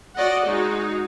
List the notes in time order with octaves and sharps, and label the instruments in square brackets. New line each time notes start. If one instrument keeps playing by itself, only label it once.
[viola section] F#4 D5 D#5 F#5
G#3 D#4 F#4